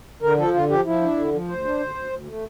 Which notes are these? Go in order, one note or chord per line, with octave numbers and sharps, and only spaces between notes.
D3 A#4
F3 A4
D3 F4
F3 G4
F3 E4
D4
D3
F3
D2 C5
D4
D2
D2
D2
A3